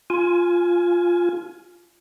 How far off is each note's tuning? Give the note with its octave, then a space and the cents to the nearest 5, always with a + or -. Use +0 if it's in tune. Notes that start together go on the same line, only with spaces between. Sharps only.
F4 +0 G#5 +20